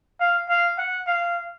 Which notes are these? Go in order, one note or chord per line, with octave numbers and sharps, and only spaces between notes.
F5
F5
F#5
F5